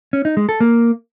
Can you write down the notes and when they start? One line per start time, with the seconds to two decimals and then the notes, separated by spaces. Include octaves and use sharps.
0.13 C#4
0.25 D#4
0.37 G#3
0.49 A4
0.60 A#3